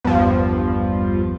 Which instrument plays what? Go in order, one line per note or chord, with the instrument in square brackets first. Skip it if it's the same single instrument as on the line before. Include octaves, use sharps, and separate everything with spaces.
[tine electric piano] G#1 E2 B3 [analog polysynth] G2 F3